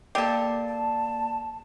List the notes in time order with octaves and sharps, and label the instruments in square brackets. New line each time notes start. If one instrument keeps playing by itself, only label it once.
[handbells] A#3 D5 C7 [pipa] G4 A4
[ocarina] A5